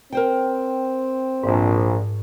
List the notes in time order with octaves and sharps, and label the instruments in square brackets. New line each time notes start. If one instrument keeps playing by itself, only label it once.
[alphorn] C4 [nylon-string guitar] A#4 C5 G5
[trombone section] A#1 [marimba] G#2